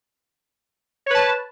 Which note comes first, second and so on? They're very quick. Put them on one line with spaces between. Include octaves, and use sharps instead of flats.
C#5 B4 A5